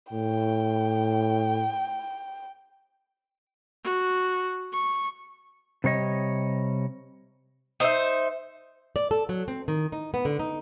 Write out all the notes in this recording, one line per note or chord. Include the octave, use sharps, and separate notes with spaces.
A2 G5
F#4
C#6
C3 G3 C#5 D#5
D#4 C5 D5 E5
D5
A4
F#3
C4
D#3
D#4
B3
D3
D#4